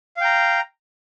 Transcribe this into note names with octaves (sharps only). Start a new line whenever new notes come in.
F5 G5 A#5